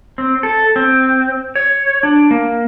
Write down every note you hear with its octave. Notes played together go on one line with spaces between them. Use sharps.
C4
A4
C4
C#5
D4
A#3